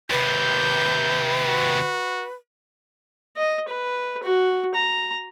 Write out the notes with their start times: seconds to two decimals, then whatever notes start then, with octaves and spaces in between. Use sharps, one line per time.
0.10 D#2 C3 B4 G6
1.49 F#4
3.37 D#5
3.69 B4
4.23 F#4
4.75 A#5